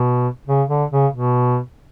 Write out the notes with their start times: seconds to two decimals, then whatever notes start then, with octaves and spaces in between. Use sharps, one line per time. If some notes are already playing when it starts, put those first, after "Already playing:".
Already playing: B2
0.47 C#3
0.69 D3
0.91 C#3
1.13 B2